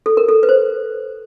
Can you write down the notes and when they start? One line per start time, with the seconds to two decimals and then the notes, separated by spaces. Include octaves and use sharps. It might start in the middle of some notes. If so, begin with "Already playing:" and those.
0.06 A4
0.17 A#4
0.29 A4
0.43 B4
0.49 C5